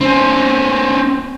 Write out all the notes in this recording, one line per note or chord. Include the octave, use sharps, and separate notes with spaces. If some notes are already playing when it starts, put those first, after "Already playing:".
C4 C#4